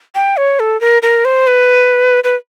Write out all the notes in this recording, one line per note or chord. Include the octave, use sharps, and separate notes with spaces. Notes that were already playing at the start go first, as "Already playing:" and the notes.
G5
C#5
A4
A#4
A#4
C5
B4
B4